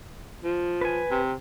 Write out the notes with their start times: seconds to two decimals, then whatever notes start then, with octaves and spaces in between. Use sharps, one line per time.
0.44 F3
0.81 B4 G#5
1.11 C3